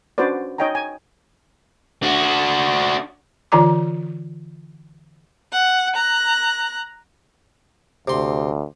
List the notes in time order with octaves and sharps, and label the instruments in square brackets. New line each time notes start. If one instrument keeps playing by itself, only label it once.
[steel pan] C#4 D4 F#4 B4 C5 D5
D#4 C#5 D#5 G5 G#5 A#5
G#5
[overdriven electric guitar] D4 F#4
[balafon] D3 E3 F4 D5 A#5 D6
[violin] F#5
A#5 F#6
[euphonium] D2 [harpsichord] C3 C6